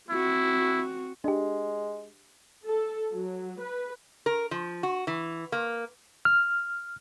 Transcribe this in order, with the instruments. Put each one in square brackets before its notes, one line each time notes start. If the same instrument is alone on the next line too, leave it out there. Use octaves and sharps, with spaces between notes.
[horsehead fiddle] C4 F#4 [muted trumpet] E4
[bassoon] G#3 [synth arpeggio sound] D4 G4
[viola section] A4
F#3
B4
[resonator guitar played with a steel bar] A#4
F3
F#4
E3
A#3
[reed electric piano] F6